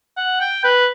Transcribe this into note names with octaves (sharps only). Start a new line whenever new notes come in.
F#5
G5
B4